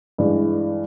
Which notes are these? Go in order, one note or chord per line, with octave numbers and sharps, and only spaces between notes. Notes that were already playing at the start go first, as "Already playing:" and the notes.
G2 E3 G#3